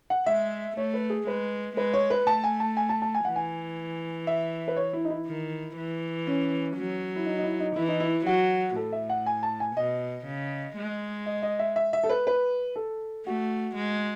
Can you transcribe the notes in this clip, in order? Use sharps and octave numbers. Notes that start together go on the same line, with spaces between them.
F#5
G#3 E5
A3 C#5
B4
G#4
G#3 B4
G#3 B4
C#5
B4
A3 A5
G#5
A5
G#5
A5
A5
G#5
E3 F#5
G#5
E5
B4
C#5
E4
D#4
E4
D#3
E3
C#4
F#3
E4
D#4
D#4
E4
D#4
E3 E4
D#4
E4
F#3 F#4
A2 A4
E5
F#5
G#5
A5
G#5
B2 D#5
C#3
G#3
D#5
D#5
E5
E5
E5
A4
B4
B4
A4
A3 F#4
G#3